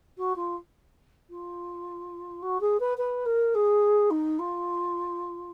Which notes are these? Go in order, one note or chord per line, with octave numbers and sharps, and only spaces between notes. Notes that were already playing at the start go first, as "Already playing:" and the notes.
F#4
F4
F4
F#4
G#4
B4
B4
A#4
G#4
D#4
F4